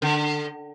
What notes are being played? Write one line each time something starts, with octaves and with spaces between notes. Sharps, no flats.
D3